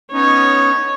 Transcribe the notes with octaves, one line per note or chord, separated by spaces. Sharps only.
B3 C#4 D#4 C#5